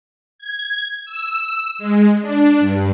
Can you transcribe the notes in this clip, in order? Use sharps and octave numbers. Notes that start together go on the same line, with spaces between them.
G#6
E6
G#3
D4
G2